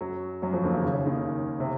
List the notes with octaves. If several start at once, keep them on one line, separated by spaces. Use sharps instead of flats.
F#2 F#3
F#2 F#3
F2 F3
D#2 D#3
C#3
C#3
C#3
D#2 D#3
C#3
C3